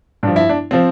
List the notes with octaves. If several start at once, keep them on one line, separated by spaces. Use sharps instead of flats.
G2 F3 D4
E4
D4
F3 C4